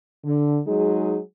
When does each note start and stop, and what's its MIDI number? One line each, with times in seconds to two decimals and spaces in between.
0.24 0.59 50
0.65 1.19 54
0.65 1.19 56
0.65 1.19 63
0.65 1.19 68